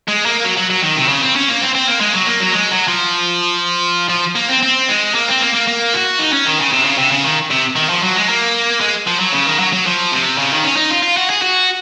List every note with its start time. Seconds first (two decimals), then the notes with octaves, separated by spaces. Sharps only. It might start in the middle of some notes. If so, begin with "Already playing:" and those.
0.08 G#3
0.26 A#3
0.44 F#3
0.57 F#3
0.70 F#3
0.83 D#3
0.96 C3
1.09 C#3
1.22 C4
1.35 C#4
1.49 A#3
1.61 C4
1.75 C4
1.87 A#3
2.01 G#3
2.14 F#3
2.27 A#3
2.40 F#3
2.52 G#3
2.71 F#3
2.88 F3
4.10 F3
4.36 A#3
4.49 C4
4.63 C4
4.89 G#3
5.14 A#3
5.28 C4
5.41 A#3
5.54 A#3
5.67 A#3
5.94 F#4
6.19 D#4
6.32 C#4
6.46 D#3
6.59 C#3
6.72 C3
6.85 C#3
6.98 C3
7.12 C#3
7.24 D#3
7.51 C3
7.76 D#3
7.89 F3
8.03 F#3
8.16 G#3
8.29 A#3
8.81 G#3
9.07 F3
9.20 F#3
9.33 C#3
9.47 D#3
9.60 F#3
9.73 F#3
9.86 F3
10.12 C3
10.38 C#3
10.52 D#3
10.64 C#4
10.77 D#4
10.90 F4
11.03 F4
11.17 F#4
11.30 G#4
11.42 F#4